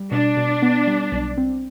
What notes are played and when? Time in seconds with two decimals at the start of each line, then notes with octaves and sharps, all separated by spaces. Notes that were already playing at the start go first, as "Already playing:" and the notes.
Already playing: G3
0.12 B2 D4
0.37 B2
0.62 B3
0.87 G3
1.12 B1
1.38 C4